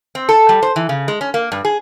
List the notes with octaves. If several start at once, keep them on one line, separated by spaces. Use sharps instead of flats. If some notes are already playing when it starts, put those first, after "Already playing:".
C4
A4
G3
C5
E3
C#3
G#3
C#4
A#3
G2
G#4